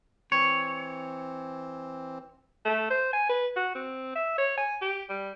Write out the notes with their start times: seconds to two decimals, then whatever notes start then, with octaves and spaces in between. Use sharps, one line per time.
0.32 E3 C4 C#5
2.65 A3
2.90 C5
3.13 G#5
3.29 B4
3.56 F#4
3.75 C4
4.16 E5
4.38 C#5
4.57 G#5
4.81 G4
5.09 G3